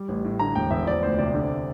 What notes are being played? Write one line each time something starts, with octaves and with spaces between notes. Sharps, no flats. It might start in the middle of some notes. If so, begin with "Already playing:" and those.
Already playing: G3
A1
A2
D3 A#5
E1 G5
E2 E5
F3 D5
D2 C5
C3 D5
D3